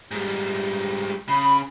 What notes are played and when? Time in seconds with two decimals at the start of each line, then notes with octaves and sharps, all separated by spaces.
0.11 G#2 G3
1.29 C#3 B5